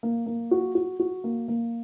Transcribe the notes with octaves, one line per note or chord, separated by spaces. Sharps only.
A#3
A#3
F#4
F#4
F#4
A#3
A#3